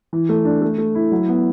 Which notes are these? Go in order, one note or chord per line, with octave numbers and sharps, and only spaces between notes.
E3
A3
D4
A3
A3
E4
F#3
B3